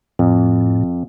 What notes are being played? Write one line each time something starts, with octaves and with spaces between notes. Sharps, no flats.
F2 A2